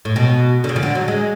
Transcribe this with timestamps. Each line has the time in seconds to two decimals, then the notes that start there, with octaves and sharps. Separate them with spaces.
0.05 A2
0.16 B2
0.64 D3
0.69 C#3
0.76 F3
0.83 D3
0.95 F#3
1.08 G#3